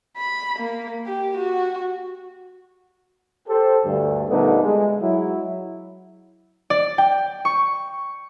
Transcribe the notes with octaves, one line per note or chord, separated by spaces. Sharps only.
B5
A#3
G4
F#4
G4 A4 C5
D2 G2
A#2 D3 G3 A3 B3 D#4
G#3
F#3 E4
D5
G5
C#6